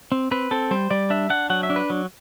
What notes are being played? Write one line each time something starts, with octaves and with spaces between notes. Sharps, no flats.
C4
C4 B4
C4 A4
G3 C5
G3 D5
D4 E5
D4 F#5
F#3 F#5
E5
D4
B4
F#3